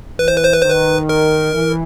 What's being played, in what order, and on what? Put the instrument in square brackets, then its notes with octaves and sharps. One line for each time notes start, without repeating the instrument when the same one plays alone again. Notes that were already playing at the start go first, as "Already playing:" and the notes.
[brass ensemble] E3 [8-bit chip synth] B4
[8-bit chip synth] C5
B4
C5
B4
[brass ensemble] D#3 [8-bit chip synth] C5
[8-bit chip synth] B4
A#4
[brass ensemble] E3